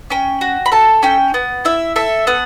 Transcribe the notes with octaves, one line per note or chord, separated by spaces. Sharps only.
C#4 G5
F#4
B5
A4 A5
C#4 G5
B3 F#5
E4 E5
A4 E5
B3 F#5